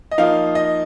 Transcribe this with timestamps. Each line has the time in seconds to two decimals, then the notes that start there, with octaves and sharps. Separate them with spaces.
0.11 D#5
0.18 F3 A#3 D#4 F5
0.55 D#5